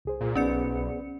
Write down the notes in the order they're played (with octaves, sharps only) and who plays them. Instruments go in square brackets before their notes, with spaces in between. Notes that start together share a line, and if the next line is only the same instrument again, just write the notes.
[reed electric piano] C2 G#4 C5
[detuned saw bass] A#2
[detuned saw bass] B1 [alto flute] B3 [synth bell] C#4 D5 C#7